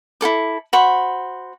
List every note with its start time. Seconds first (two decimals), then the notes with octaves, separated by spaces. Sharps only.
0.21 E4 F4 A4 D6
0.73 F#4 C5 B5 C#6